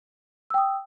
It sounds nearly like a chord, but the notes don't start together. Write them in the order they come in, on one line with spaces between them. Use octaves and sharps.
E6 G5 D#6